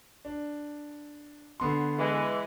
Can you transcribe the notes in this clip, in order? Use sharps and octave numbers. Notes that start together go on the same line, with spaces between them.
D4
D3 B3 C6
E3 G#3